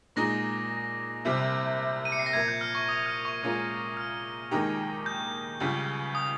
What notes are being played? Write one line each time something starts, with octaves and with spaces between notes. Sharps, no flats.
A#2 G#3 D#4 A#6
C2 C3 G3 C4
D#7
C#7
C7
A#6
A#2 F3 A#3 G#6
G6
F6
C#6
D#6
F6
C#6
A#2 G#3 C#4 F4 A#4
F6
D#2 D#3 G#3 D#4 G4
G6
C#2 C#3 G3
D#6